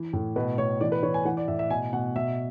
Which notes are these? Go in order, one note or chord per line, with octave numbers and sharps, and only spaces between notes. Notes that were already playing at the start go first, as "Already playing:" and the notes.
Already playing: E3
A2
B2 B4
B2 C#5
E3 D5
B4
E3 C#5
G#5
E3 F#5
D5
A2 E5
E5
B2 G#5
B2 F#5
B2 E5